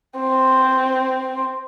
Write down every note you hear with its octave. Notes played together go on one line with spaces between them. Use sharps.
C4